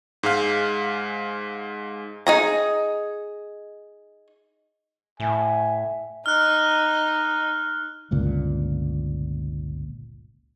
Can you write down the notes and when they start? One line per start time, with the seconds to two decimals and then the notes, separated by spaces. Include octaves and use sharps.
0.23 G#2 G#3 F5
2.27 D#4 G#4 A#5
5.20 A2 E5 G#5
6.26 D#4 D#5 F6 F#6
8.11 G1 C#2 A#2